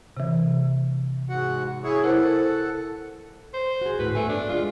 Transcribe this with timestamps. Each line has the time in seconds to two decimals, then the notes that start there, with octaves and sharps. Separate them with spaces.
0.17 C3 E3
1.29 G#2 F#4 F#5
1.84 E4 G#4 C#5
2.04 E4 A4 A#4 C5 F#5
3.54 C5
3.81 F#4 G#4
3.99 D2 A2 F#4 B4
4.15 G2 A3 B3 G#5
4.28 D4
4.49 G#3 F4